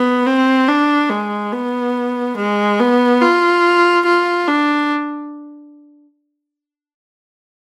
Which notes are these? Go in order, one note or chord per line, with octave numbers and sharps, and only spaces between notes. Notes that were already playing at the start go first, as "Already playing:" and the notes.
Already playing: B3
C4
D4
G#3
B3
G#3
B3
F4
F4
D4